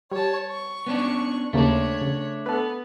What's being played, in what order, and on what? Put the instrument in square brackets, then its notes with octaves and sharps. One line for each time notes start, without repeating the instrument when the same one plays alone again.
[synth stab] G3 [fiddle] C#5 A5
[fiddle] C#6
[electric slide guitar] B3 C#4 D4
[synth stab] D#2 C#3 A#3 [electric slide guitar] A3 D4 [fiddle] C#5
[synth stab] C#3
[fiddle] B3 [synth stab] A4 B4